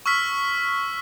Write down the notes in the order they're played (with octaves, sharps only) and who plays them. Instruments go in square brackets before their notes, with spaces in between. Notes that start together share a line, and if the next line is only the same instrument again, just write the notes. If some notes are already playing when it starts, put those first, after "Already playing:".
[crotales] C#6 E6 F6 B6